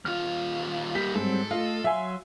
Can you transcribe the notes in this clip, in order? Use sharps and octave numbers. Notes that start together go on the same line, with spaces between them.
D#2 F4 F6
G3 A#3 G4 B6
G#2 F#3 G3 C4 A4
A3 F4 D#5
F#3 E5 F5 G#5 C6